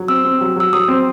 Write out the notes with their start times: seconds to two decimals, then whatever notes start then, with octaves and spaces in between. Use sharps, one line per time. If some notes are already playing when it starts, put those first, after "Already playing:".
Already playing: F#3
0.08 C4 E6
0.25 C4
0.41 F#3
0.56 F#3 E6
0.73 F#3 D#6
0.88 C4